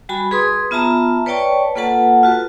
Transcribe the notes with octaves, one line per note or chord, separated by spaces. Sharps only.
G3 F#4 G#5 B5
G#4 B4 C6 D#6
B3 F4 E5 A5 A#5
B4 C#5 D5 G5 A5 C#6
A#3 F4 A4 B4 F#5 A5
F4 F#4 B4